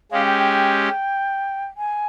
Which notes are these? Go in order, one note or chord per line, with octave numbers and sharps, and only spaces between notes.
G#3 C#4 G4 F5
G5
G5
G5
G#5